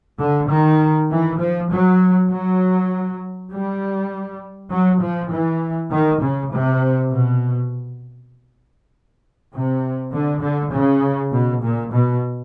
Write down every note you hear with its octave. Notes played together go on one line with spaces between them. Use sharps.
D3
D#3
E3
F3
F#3
F#3
G3
F#3
F3
E3
D#3
C#3
C3
B2
C3
D3
D3
C#3
B2
A#2
B2